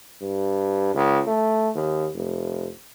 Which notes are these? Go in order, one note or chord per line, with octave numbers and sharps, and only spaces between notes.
G2
C#2
A3
D#2
F1